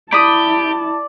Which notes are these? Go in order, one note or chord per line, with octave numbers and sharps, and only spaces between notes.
E4 G4 D5 A5 B5 D#6